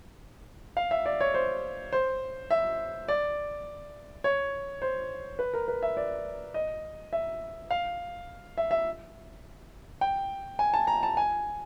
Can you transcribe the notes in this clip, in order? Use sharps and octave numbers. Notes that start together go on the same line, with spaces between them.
F5
E5
D5
C#5
C5
C5
E5
D5
C#5
C5
B4
A#4
B4
E5
D5
D#5
E5
F5
E5
E5
G5
G#5
A5
A#5
A5
G#5